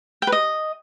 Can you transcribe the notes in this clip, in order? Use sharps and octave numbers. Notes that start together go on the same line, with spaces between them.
G5
B4
D#5